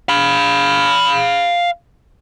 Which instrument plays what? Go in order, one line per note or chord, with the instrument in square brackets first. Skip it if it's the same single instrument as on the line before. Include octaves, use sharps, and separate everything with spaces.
[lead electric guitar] F5 B5